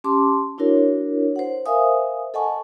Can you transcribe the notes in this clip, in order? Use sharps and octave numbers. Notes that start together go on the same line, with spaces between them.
C#4 G4 A5 C6 D6
D4 E4 F#4 A#4 C#5
C5 C#5 F#5
A#4 C5 E5 F5 G#5 D#6
A4 D#5 F#5 G#5 A5 C#6